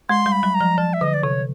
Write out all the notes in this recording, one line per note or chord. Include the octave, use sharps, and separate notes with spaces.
G#3 C6
G3
B5
F#3
A#5
F3
F3 A5
E5
D3 D#5
D5
C3 C#5